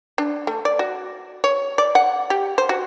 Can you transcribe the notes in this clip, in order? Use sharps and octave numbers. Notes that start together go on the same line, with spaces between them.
D4
A3
D5
F#4
C#5
D5
F#5
G4
C5
F#4